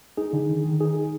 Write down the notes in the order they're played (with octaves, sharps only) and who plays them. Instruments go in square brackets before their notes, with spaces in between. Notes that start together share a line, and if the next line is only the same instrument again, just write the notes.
[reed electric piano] D#4 [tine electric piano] G#4
[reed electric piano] D3
D#3
D#3
[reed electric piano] D#4 [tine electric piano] G#4